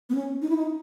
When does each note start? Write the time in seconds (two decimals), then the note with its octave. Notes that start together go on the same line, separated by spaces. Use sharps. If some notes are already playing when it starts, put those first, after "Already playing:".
0.10 B3
0.15 C#4
0.42 D#4
0.49 E4
0.56 D#4